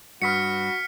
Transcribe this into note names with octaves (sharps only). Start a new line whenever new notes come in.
G2 F#4 B4 F6 B6 C#7